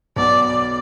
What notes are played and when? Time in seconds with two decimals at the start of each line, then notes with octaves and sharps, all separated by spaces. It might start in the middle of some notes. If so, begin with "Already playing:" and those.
0.16 B1 B2 B3 D5
0.46 D5